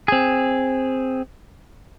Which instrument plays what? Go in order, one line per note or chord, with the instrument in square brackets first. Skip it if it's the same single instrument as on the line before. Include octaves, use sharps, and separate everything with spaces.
[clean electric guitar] C4 G#4